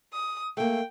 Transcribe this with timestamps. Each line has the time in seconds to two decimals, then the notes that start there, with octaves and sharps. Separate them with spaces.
0.13 D#6
0.57 A3 A#3 G5